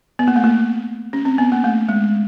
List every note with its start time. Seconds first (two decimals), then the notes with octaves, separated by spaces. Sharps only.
0.19 B3
0.28 A#3
0.36 A3
0.44 A#3
1.13 C#4
1.25 C4
1.38 B3
1.52 A#3
1.64 A3
1.89 G#3